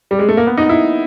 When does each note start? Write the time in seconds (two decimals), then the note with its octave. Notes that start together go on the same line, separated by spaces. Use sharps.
0.11 G3
0.19 G#3
0.29 A3
0.37 A#3
0.47 B3
0.57 D#4
0.69 E4